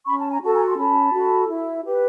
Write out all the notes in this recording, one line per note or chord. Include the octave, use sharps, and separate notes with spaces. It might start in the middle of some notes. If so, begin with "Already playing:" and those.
C#4 B5 C#6
A5
G#5 A#5
F#4 A4 A5
G#5 A#5
C6
C#4 A5 B5
F#4 A4
E4
G4 B4